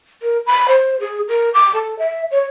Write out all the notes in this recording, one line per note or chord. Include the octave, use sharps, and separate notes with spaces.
A#4
B5
C5
G#4
A#4
D6
A4
E5
C#5